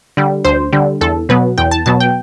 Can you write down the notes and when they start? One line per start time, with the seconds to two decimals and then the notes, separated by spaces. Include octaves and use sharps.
0.17 D3 G3
0.45 D2 C5
0.73 D3 G3
1.01 E2 A4
1.29 B2 F#3 B3 B4
1.58 E2 G5
1.71 A5
1.86 B2 F#3 B3 A5
2.00 G5